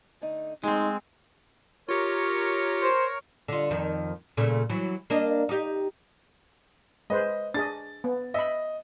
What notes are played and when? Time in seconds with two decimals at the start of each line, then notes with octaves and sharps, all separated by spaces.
0.21 D3 A3 D#4
0.64 F2 G#3 A3 C4 D#4 G#4
1.89 F4 G4 A#4 C#5 C#6
2.83 C5
3.48 D3 F4
3.71 F2 D#3
4.37 A#2 C#3 A3
4.70 E3 F#3
5.10 A#3 D4 D#5
5.49 D#4 G4
7.10 G#3 B4 C5 D#5
7.54 D4 G#4 D#5 A6
8.04 B3
8.34 D#5 E5 B5